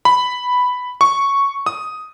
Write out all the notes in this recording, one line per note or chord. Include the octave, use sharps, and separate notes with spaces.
B5
C#6
D#6